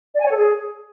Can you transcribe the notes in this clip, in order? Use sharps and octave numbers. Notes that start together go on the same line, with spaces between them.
D5
G#5
C#5
A4
G#4